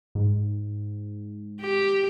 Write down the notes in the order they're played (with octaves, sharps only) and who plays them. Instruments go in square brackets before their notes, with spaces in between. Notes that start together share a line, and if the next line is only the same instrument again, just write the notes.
[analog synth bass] G#2
[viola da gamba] G4